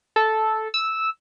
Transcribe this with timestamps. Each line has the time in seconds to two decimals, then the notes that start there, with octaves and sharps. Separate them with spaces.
0.16 A4
0.74 E6